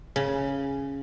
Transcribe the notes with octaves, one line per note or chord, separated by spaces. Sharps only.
C#3